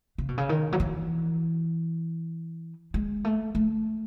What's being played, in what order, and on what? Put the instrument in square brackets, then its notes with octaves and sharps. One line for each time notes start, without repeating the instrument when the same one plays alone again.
[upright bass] C#3
B2
C#3
D#3
F#3
E3
G#3
A3
A3